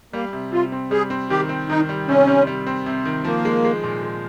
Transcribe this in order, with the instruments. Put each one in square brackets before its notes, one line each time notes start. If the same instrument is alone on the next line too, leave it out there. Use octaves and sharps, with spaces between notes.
[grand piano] G3 [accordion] A#3
[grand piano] C3
[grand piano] C3 [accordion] F4
[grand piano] C4
[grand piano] G3 [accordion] G#4
[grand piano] C4
[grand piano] D#3 [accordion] G4
[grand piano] C4
[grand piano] D#3 [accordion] D#4
[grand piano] G3
[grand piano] C3 [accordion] C#4
[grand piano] G3
G3
C4
C3
D#3
[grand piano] F3 [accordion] A#3
[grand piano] G#3
G#3
A#2
G#3